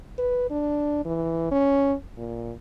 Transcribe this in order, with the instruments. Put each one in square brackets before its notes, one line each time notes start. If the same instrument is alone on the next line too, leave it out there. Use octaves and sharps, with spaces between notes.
[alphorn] B4
D4
E3
C#4
A#2